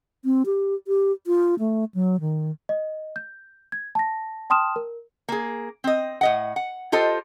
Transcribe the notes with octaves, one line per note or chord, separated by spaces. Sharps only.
C4
G4
G4
F4
A3
F#3
D#3
D#5
G6
G#6
A5 A#6
G5 A5 C6 D#6 F6 E7
A#4
A#3 G#4
C4 D#5
A2 D#5 F#5
F#5
F4 G4 A4 C5 D#5